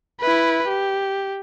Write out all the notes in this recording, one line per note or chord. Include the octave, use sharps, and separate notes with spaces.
E4 B4
G4